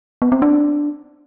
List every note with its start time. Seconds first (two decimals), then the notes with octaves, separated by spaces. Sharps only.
0.22 B3
0.32 C4
0.42 D4